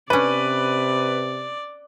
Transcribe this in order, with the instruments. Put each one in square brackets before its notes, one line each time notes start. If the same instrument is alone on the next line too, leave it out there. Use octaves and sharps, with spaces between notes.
[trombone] C3 [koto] C#4 D4 [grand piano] B4 [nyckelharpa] D5